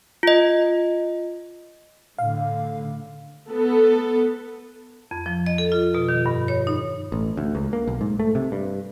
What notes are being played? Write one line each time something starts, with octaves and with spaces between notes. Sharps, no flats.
F4 D#5
A2 D3 F5
B3 A4
F2
F3
D#5
A4
F4
B2
D#3
G2
C#5
D#4
A1
D2
C#2
A#3
B1
G#2
A3
C3
G2